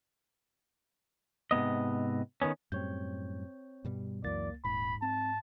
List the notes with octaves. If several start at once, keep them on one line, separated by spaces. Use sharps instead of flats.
G#2 C3 B3 D#5
D#3 F3 B3 C#4
F#2 A2 G3 C4 C#5 G6
G2 B2 G3
C#2 F#2 E3 A#3 D5 A6
D#1 G#2 B5
C4 A5